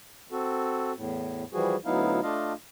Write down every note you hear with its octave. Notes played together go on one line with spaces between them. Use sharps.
C4 F#4 A4
E2 A2
E3 F3 G3 F#4 G#4
D2 F#3 B3 D#4 E4 F5
A3 D4 F4 D#5 F5